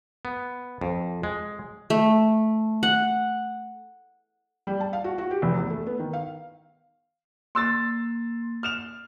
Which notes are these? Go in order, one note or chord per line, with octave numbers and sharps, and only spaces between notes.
B3
F2
G#3
A3
F#5
G3
A5
F5
F#4
F#4
G4
F1
E2
A3
B3
D#3
F5
A#3 C6 E6 A6
F6 E7 F7